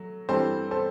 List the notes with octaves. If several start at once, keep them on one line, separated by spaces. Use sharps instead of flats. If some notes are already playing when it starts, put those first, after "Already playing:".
Already playing: F#3 A3
G2 E3 G3 C4 A4 C5
A4 C5